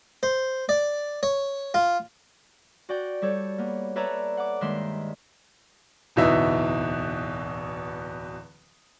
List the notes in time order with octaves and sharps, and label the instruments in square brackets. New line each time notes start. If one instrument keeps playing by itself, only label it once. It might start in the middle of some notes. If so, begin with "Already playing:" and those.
[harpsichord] C5
D5
C#5
F4
[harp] F#4 D5 G5
G3 A4 C#5
A#3 B3
A4 B4 C#5 D5 E5 A#5
F#5 D6
G2 D#3 G#3 A#3 E5 C6
[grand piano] D1 E2 B2 D#4 E5